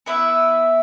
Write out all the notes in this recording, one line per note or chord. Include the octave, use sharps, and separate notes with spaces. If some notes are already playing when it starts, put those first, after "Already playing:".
B3 E4 B4 E5